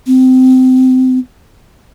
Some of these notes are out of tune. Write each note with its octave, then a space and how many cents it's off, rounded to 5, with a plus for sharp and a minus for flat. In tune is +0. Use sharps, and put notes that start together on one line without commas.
C4 -25